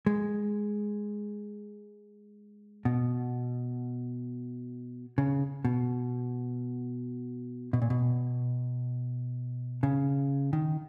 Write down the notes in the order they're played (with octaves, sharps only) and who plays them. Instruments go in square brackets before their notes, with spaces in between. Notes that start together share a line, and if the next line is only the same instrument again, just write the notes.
[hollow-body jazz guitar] G#3
B2
C#3
B2
B2
A#2
B2
C#3
D#3